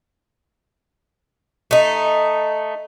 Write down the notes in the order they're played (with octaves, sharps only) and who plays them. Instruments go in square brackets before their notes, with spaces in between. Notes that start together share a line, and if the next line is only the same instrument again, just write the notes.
[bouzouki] A3 D#4